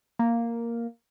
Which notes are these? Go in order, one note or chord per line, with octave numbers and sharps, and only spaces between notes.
A#3